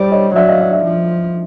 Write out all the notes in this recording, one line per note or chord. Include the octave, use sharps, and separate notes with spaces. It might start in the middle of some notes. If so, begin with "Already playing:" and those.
Already playing: G3 C5 D5
C#5 D#5
F#3 D5 E5
D#5 F5
D5 E5
D5 E5
F3